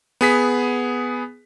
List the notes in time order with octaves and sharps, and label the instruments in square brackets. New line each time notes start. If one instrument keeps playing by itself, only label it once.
[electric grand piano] B3 G#4 B6